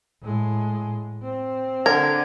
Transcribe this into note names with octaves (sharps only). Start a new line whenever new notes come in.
A2 G#3
C4
D3 A#4 G#6